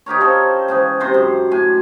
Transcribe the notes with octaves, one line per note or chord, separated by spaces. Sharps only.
D#4 G4 A#4 C#5
F3 C#4 A4
G#2 C#3 E3
G#2 C3 C5
F#2
A2 G#5